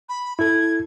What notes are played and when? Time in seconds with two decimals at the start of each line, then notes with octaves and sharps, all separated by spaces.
0.09 B5
0.39 E4 A4 G#6